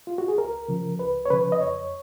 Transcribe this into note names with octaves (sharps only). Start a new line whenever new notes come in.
F4
F#4
G#4
C#2 A#4
C#3 F3
C#2 B4
C#5
C#3 F3 B4
D#5
F2 C#5